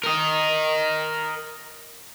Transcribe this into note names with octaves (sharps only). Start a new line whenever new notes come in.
A#4 D#5